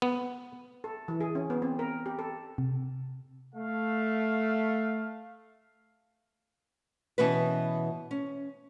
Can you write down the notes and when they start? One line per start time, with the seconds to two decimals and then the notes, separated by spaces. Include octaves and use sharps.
0.02 B3
0.84 A4
1.08 E3
1.20 G#4
1.35 C#4
1.50 B3
1.62 C4
1.79 A#4
2.06 G4
2.19 A4
2.58 C3
3.55 A3 F5
7.18 B2 E3 B3 C#4 F#4 B4
8.11 C#4